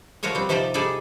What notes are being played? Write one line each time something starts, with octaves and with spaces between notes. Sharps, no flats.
F3 F4 F#4 A#4 C#5 D#5
G3 C4
C3 F3 D#4 G4 C5 D5
G3 D#4 G#4 A4 D5